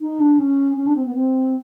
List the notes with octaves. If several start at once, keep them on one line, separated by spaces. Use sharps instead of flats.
D#4
D4
C#4
C#4
D4
C4
B3
C4